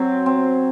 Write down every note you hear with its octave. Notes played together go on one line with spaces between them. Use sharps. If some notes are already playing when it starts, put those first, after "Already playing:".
Already playing: F#3 C4
C4